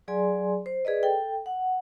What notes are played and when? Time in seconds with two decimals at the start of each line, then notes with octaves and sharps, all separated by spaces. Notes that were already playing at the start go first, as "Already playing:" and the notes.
0.08 F#3 G#4 D5 G#5 C6
0.66 C5
0.85 G#4 B4 D5 D#5
1.03 A4 G5
1.46 F#5